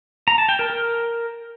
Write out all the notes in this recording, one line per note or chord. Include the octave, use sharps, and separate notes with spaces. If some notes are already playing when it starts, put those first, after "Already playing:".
A#5
A5
G5
A#4
A#4